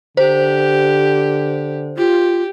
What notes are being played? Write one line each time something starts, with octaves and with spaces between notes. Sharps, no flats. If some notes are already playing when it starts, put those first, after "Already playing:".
D3 G4 C5
F4 G4